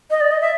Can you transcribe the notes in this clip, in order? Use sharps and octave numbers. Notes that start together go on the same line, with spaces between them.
D#5
D5
D#5
E5